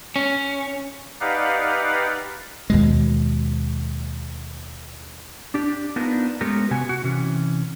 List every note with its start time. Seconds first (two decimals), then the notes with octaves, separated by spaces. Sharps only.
0.16 C#4
1.21 D#4 G4 B4 D5 F5 F#5
2.70 D#2 B2 G#3
5.54 D4 G4
5.96 B3 D4 D#4 F4 A#4 B4
6.41 G#3 A3 B3 C#4 G4 A#4
6.71 C3 B3 F#4 G#5
6.89 F#4
7.04 C3 E3 C#4